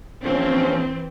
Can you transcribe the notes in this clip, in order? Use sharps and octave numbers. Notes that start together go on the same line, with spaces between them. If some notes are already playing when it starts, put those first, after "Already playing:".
A#1 E3 F3 C4 C#4